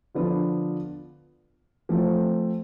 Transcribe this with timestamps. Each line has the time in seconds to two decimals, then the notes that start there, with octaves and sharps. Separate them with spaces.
0.15 D3 F3 B3 D4 F4
1.89 F3 A3 C4 F4